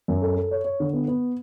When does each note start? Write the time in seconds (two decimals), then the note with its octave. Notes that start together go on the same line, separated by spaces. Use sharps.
0.08 F#2
0.22 A4
0.37 A4
0.51 C#5
0.65 C#5
0.80 D3
0.93 B3
1.08 B3